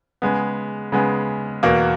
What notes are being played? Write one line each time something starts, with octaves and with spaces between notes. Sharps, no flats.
C#3 G#3 B3
C#3 G#3 B3
E2 B2 A#3